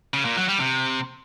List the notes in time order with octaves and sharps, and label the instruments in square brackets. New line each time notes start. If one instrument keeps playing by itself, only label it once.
[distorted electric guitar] C#3
A#2
F#3
G3
C3